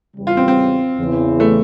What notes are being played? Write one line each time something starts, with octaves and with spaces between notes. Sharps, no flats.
E2 C#3 E3 G3
F4
C4
C4
E2 C#3 E3
A3